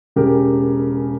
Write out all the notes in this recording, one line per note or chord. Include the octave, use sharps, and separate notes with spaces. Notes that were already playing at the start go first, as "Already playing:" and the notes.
E1 C#3 G4 A#4